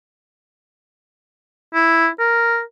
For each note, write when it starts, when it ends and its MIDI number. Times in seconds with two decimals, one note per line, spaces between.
1.74 2.08 64
2.19 2.61 70